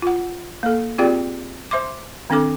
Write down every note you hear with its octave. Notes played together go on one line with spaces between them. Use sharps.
F4 F#5
A#3 A4
C4 F4 G4 G#4 D5 G5
C5 E5 C6 D6
D#3 C4 D4 A4 D6